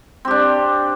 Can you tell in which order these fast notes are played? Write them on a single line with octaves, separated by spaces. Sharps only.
C4 G4 D4